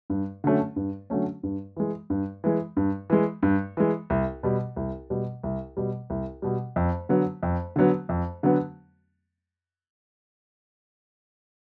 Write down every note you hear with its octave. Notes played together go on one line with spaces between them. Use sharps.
G2
D3 F#3 A3 C#4
G2
D3 F#3 A3 C#4
G2
E3 G#3
G2
E3 G#3
G2
E3 G#3
G2
E3 G#3
C2
B2 G3
C2
B2 G3
C2
B2 G3
C2
B2 G3
F2
D3 F#3 B3
F2
D3 F#3 B3
F2
D3 F#3 B3